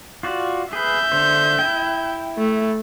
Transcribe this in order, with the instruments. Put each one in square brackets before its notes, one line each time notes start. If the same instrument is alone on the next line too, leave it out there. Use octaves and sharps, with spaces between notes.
[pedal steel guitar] F4 F#4 D5
[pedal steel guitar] G#4 B4 [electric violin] E5 G6
[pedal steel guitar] D3 C5
E4 G5
[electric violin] A3